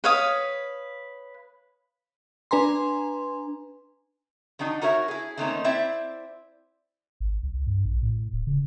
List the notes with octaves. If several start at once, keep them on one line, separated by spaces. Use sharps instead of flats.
B4 C#5 F5 D#6
D4 B4 G#5 A#5 C6
D#3 F#3 D4 D#4
D#4 F#4 A#4 C#5 E5
E4 G#4
D#3 A3 A#3 C4 C#4 D#4
C4 E4 C5 D5 E5
G#1
C2
G2
A#1
A2
D1
C#3